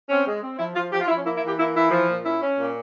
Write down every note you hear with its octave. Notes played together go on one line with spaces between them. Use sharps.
C4 C#4
G#3
C4
F3 E4
F3 F4
F3 G4
F4
F3 E4
C#4
A#3 E4
E4
E3 G4
A#3 E4
E3 E4
F3
A#2
C#4 E4
C#4
A#2